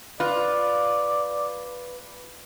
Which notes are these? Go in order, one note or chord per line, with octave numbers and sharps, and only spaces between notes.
F4 B4 D5